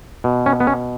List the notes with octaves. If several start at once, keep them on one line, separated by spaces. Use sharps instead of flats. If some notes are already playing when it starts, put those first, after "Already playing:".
B2
C#4
B3
C#4